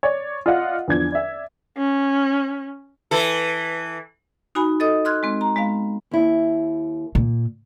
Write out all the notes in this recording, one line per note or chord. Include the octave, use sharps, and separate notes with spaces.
C#5 D5
F4 D5 D#5 F5 F#5
E2 F3 D4 G#6
D5 E5
C#4
E3 A4
D#4 F#4 G#5 B5
A4 D#5 D#6
C6 F6 F#6 G#6
G#3 C4
A#5
G#3 B3 F5
D#2 E4
A#2